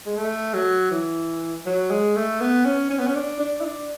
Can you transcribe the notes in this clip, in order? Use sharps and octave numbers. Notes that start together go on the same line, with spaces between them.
G#3
A3
F#3
E3
F#3
G#3
A3
B3
C#4
C#4
B3
C#4
D4
D4
E4
D4